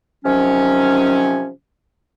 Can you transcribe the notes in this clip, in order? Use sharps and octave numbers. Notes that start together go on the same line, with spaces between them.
C3 D#3 F3 F#3 C#4